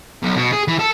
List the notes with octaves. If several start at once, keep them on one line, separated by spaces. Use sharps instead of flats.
B1
B2
G#4
E3
A4